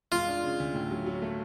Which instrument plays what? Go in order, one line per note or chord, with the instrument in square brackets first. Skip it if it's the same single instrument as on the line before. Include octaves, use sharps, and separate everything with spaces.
[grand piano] G#3 [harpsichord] F4
[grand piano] D4
C#3
D2
A2
F#3
F#3
A3